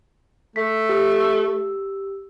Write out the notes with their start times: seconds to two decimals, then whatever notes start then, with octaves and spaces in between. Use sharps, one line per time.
0.56 A3 B6
0.89 G4 E6